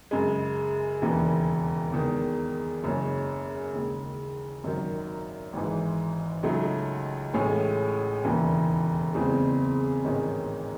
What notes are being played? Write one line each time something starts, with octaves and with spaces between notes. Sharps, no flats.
F#2 C#3 G#3
E1 D#2 C#3 E3
E2 D#3 G#3
F#1 F#2 C#3 G#3 C#4
D#2 C#3 G#3
G#1 F#2 D#3 F#3
G#1 G#2 E3
C#2 C#3 F#3 A3 D#4
A1 A2 G#3 C#4 G#4
E1 D#2 C#3 E3
F#1 E2 C#3 G#3 C4
A1 G#2 D#3 G#3 C#4